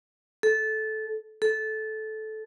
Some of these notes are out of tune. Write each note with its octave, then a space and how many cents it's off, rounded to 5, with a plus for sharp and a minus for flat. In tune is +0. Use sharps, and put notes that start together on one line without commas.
A4 -15
A4 -15